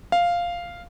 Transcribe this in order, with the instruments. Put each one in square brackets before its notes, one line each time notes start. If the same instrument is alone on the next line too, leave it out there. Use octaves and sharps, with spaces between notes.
[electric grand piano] F5